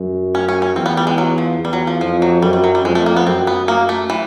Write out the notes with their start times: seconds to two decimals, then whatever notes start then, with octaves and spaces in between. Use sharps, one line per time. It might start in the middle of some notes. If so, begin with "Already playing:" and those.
Already playing: F#2
0.35 C#4
0.48 C#4
0.62 C#4
0.76 E2 C4
0.86 B3
0.97 G3
1.07 G#3
1.18 F#3
1.38 F3
1.60 E2
1.65 G3
1.73 F#3
1.87 F3
2.01 F2 F3
2.22 F#3
2.42 F#2 G3
2.53 G3
2.64 F#3
2.75 G3
2.85 F2 G#3
2.95 A3
3.06 A#3
3.16 B3
3.27 F#2 C4
3.47 B3
3.68 A#3
3.89 A3
4.10 E3